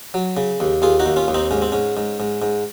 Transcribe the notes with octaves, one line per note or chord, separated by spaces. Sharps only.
F#3
C#3
D#2
D#2 F4 G#4
D#4 F#4
D#2
C#4 F4
D#2
C4 D#4
G#2 C#4
C4
G#2 C#4
G#2
G#2
G#2